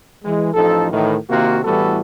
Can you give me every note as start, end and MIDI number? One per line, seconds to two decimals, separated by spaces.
0.24 0.51 52
0.24 0.51 56
0.54 0.87 33
0.54 0.87 53
0.54 0.87 63
0.54 0.87 69
0.91 1.16 45
0.91 1.16 51
0.91 1.16 52
1.29 1.60 48
1.29 1.60 51
1.29 1.60 58
1.29 1.60 65
1.29 1.60 66
1.65 2.00 45
1.65 2.00 52
1.65 2.00 55
1.65 2.00 59
1.65 2.00 66
1.65 2.00 69